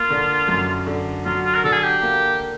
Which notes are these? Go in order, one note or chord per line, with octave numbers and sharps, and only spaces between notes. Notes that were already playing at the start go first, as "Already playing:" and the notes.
Already playing: A#3 F4
D3
F#2
D3
F#3 F4
F4
A#4
D3 A4
G#4
G4
A#3